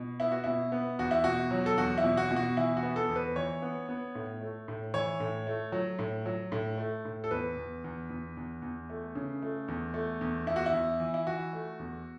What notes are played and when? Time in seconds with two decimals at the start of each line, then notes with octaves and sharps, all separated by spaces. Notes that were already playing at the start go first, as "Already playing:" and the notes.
Already playing: B2
0.20 B3 E4
0.32 F#4
0.44 B2 E4
0.72 B3
0.99 E2 F#4
1.11 E4
1.24 B2 F#4
1.51 F#3
1.66 A4
1.77 E2 F#4
1.98 E4
2.04 B2
2.17 F#4
2.31 B2
2.36 F#4
2.57 E3 E4
2.77 F#4
2.83 B3
2.96 A4
3.09 E2
3.16 B4
3.36 E3 C#5
3.62 B3
3.89 B3
4.15 A2
4.41 A3
4.68 A2
4.94 E3 C#5
5.20 A2
5.47 A3
5.72 F#3
5.99 A2
6.26 F#3
6.52 A2
6.78 A3
7.05 A2
7.24 A4
7.31 E2 B4
7.57 E2
7.84 E2
8.10 E2
8.37 E2
8.62 E2
8.90 A3
9.15 C#3
9.42 A3
9.68 E2
9.94 A3
10.21 E2
10.46 E2 E4
10.56 F#4
10.66 E4
10.73 E2
11.00 E3
11.14 E4
11.27 E3 F#4
11.53 A3
11.79 E2